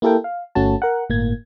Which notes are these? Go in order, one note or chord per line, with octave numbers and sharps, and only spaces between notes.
A#3 E4 G4 A4 A#4 G5
F5
G1 A3 C#4 F#4 A5
A#4 F#5
G1 A2 A#3 G#6